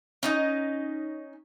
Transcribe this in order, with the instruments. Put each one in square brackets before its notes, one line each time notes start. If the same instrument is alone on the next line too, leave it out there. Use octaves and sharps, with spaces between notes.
[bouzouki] C#4 D#4 D#5